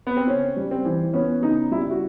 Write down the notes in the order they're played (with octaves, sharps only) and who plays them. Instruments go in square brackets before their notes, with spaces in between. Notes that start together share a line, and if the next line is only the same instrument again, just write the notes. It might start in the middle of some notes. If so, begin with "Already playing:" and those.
[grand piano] B3
C4
[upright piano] C#3 [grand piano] C#4
[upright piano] G3
[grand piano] C4
[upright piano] E3
[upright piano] B3 [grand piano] C#4
[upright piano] C#3 [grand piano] D#4
[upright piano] G3 [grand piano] E4
[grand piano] F#4